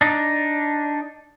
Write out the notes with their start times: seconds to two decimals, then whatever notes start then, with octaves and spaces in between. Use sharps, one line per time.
0.01 D4 D#4